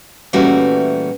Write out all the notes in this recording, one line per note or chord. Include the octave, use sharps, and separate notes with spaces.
A#2 E3 G3 A3 C#4 F#4